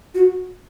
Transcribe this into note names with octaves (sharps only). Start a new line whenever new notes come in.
F#4